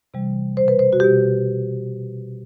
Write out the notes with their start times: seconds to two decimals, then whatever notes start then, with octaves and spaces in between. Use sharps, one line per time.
0.14 C3 E3 G3
0.57 B2 G3 C5
0.68 B4
0.79 C5
0.93 F#4
1.00 B2 G3 G4